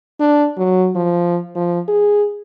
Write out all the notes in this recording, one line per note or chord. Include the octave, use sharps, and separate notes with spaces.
D4
F#3
F3
F3
G#4